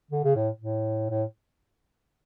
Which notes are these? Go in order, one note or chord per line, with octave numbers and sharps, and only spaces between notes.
D3
C#3
A2
A2
A2